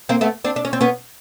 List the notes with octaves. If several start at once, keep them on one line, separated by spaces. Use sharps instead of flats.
A#3 C4
A3 B3
C4 D4
D4
C#4
C4
B3 C#4